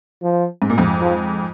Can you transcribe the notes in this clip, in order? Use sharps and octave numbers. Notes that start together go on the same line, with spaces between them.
F3
G#2
A#2
F2 G#2
F3